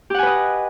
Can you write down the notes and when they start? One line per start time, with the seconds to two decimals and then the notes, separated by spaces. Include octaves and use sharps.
0.10 G4
0.14 F#5
0.19 G#5
0.23 B4
0.27 D#5